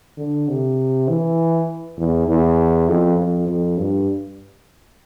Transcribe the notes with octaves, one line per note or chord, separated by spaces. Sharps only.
D3
C3
E3
E2
E2
F2
F2
F2
G2